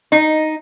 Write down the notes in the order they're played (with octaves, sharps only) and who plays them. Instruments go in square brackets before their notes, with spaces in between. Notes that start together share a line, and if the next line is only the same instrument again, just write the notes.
[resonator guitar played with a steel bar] D#4